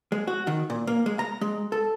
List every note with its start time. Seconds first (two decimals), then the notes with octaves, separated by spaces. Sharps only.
0.12 G#3
0.27 F#4
0.47 D#3
0.70 A#2
0.87 A#3
1.06 G#3
1.19 A#5
1.41 G#3
1.72 A4